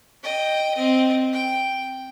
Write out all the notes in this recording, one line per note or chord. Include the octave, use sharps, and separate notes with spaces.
D#5 G5
C4 D#5
G5